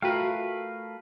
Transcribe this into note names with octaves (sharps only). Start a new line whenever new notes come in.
A3 F4 F#4 A#4 B4 F5 G5